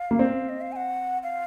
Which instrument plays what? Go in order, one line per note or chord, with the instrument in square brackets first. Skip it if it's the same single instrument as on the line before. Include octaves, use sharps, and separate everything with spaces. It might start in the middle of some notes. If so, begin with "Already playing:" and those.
Already playing: [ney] F5
[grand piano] A#3
C4
[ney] D#5
F5
G#5
F#5
F5